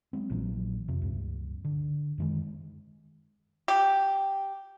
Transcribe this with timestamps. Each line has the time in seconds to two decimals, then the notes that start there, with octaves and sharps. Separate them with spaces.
0.13 F#3 G#3 C4
0.30 A#1 A#2 E3 F#3
0.88 F2 C3
1.02 C#2 G2
1.64 D3
2.18 F#2 D#3 G#3
3.68 G4